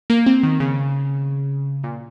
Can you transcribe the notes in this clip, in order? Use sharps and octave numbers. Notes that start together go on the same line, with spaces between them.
A#3
C4
D#3
C#3
A#2